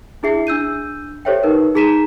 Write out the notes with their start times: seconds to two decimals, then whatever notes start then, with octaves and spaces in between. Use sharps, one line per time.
0.23 D4 E4 G#4 E5 C7
0.47 D4 E6 G6 D#7
1.25 G4 A4 C5 C#5 E5 G5
1.43 D#4 A#4 B4
1.75 D#4 G#4 A#5 B6 D#7 E7